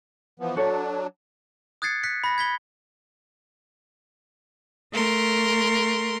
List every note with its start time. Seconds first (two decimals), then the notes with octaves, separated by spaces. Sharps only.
0.40 E3 F3 B3
0.56 F#3 D4 F#4 A4 C#5
1.82 D#6 F#6 G#6 A6 C7 C#7
2.03 F#6 B6 C#7
2.24 B5 A#6
2.38 G#6 B6 G7
4.92 A3 A#4 C6